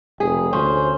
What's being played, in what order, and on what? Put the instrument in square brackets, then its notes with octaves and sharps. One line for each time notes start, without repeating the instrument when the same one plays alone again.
[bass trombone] F1 [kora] G#4
[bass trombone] D2 [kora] C#4 [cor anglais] C5